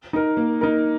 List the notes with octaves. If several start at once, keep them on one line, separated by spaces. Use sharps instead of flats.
D#4 A#4
A#3
D#4 A#4